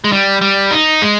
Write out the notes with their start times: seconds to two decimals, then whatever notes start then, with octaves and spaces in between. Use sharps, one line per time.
0.04 G#3
0.12 G3
0.41 G3
0.71 D#4
1.02 G#3